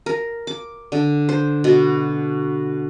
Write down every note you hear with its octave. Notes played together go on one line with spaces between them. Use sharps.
A#4
D6
D3
C5
B2